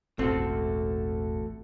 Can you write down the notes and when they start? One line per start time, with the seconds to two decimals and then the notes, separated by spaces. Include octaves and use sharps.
0.19 E1 A1 A3 C4 F#4 A4